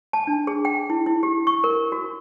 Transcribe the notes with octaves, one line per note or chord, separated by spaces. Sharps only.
A5
D4
G#4
G5
E4
E4
G4
C#6
A#4
F#4